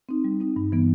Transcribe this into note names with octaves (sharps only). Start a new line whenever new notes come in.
C4 D#4
G3
C4 D#4
G2
E3 G3 B3